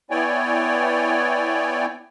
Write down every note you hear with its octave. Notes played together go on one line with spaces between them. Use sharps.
B3 E4 C#5 D5 G5 G#5